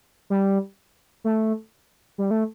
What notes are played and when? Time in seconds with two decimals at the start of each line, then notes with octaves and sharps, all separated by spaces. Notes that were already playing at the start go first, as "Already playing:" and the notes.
0.30 G3
1.24 A3
2.18 G3
2.31 A3